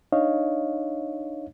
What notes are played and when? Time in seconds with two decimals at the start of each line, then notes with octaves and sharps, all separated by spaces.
0.12 D4 D#4 C#5 D#5 F5